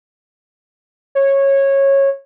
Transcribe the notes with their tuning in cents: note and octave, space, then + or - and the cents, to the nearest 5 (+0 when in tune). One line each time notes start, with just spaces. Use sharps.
C#5 -15